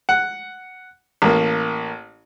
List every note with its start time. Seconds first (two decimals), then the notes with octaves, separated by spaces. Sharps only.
0.09 F#5
1.22 A1 A#3